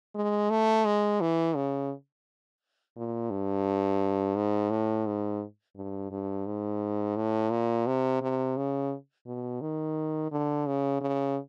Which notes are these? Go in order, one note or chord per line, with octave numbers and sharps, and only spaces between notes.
G#3
A3
G#3
E3
C#3
A#2
G2
G#2
A2
G#2
G2
G2
G#2
A2
A#2
C3
C3
C#3
B2
D#3
D3
C#3
C#3